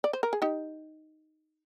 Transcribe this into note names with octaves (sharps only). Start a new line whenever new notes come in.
D5
C5
A#4
G#4
D#4 G4